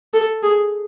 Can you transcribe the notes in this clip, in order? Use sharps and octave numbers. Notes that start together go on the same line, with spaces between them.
A4
G#4